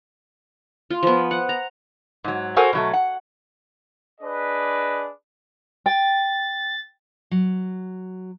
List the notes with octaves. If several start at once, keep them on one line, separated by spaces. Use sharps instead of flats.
F4
F3 B3
F#5
A#5
G#2 F#3
F#4 A4 A#4 C5 F#5 G#5
B2 F#3 A3
F#5
D4 G#4 B4 D#5
G5 A6
F#3